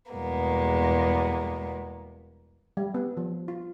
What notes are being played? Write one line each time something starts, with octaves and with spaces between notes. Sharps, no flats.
E2 B2 G3 G#3 A#3 B3
G3
B3
F3
F4